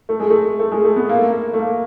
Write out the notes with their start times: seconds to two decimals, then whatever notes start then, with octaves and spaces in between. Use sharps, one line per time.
0.09 A3
0.20 G#3
0.30 A3
0.59 A3
0.72 G#3
0.85 A3
0.96 B3
1.09 A#3
1.19 A3
1.29 A#3
1.53 A3
1.59 A#3